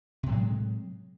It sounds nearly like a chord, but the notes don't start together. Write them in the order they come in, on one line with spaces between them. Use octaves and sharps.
C3 A2 F#3 G#3